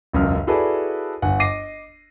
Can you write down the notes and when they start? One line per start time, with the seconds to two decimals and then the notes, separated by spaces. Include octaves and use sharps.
0.13 E1 C#2 F#2 F6
0.47 E4 F#4 G#4 A4 B4 D5
1.22 G1 F#5 G#5
1.40 D#5 D6 A#6 C7 D#7